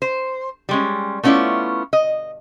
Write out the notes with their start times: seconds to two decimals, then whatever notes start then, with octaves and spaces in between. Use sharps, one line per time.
0.02 C5
0.69 G3 G#3 C#4
1.23 A3 B3 C#4 E4 F4 D5
1.93 D#5